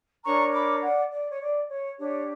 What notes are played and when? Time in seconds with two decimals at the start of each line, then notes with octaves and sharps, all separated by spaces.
0.24 D4 A#4 C#5 A#5 C#6
0.53 B5 D6
0.81 D5 F#5
1.11 D5
1.28 C#5
1.39 D5
1.68 C#5
1.97 D4 G4 C#5